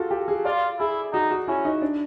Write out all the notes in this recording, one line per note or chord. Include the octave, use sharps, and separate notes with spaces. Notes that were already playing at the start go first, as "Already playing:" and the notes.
Already playing: F4 F#4 G#4 A4
G4
G#4
F4 D5
E4 G#4
D#4 F#4
F#4
C#4 E4
D#4
D4